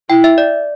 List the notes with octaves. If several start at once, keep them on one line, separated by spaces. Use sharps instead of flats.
E4 G5
E5
D5